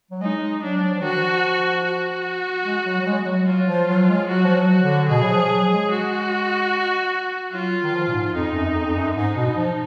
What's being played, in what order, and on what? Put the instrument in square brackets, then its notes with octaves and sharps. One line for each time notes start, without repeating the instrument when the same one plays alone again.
[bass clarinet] F#3
[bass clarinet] G#3 [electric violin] D#4
[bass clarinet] G#3
[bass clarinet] F#3 [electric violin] D4
[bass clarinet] F#3
F3
[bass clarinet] D#3 [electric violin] F#4
[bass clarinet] F3
[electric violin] F#4
[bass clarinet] G#3
F#3
F#3
G#3
G#3
F#3
[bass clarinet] F#3 [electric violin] F4
[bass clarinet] F3
F#3
G#3
[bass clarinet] F#3 [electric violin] F#4
[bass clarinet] F3
F#3
[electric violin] F#4
[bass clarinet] D3
[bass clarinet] B2 [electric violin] G#4
[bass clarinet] F#3
F3
F#3
G#3
[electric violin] F#4
[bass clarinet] F#3 [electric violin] F4
[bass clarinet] D#3
F3
A#2
G#2
[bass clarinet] F2 [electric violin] D#4
[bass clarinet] F#2
F2
F2
F#2
[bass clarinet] G#2 [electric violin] D#4
[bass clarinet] B2
F3